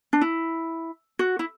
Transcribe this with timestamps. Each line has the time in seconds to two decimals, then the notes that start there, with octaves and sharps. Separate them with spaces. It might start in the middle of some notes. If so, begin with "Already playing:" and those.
0.13 D4
0.21 E4
1.19 F#4
1.39 E4